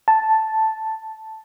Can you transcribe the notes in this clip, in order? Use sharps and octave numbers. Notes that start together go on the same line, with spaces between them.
A5